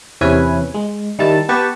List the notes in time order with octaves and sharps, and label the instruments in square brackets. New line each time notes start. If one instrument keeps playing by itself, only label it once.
[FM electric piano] E2 C3 C#4 E4 B4 G#5
G#3
D#3 G3 E4 A5
B3 G4 B4 A5 C#6